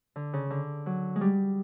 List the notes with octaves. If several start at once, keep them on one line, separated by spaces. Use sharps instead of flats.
D3
C#3
D3
F#3
G#3
G3